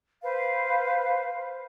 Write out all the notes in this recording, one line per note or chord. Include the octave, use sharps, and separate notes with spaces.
B4 C5 F5